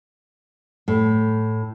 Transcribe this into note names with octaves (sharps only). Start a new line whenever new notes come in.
A2